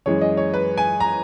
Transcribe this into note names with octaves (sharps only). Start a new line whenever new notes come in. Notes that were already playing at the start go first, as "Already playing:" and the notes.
F#2 E3 G#3 C#5
D#5
C#5
B4
G#5
A#5